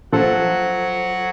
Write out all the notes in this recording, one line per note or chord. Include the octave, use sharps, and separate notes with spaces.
A#1 F#3 F4 A4 C5 F#5